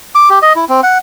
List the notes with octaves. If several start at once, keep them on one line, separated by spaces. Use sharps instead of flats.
D6
G4
D#5
E4
C4
F#5